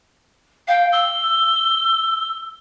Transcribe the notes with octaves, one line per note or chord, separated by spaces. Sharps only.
F5 G5
E6 G7